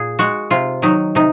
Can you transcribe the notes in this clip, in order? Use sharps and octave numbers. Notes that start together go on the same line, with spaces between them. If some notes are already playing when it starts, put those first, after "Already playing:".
Already playing: A#2 G#4
G#3 F#4
C3 F4
D#3 F#3 D#4
C3 D#4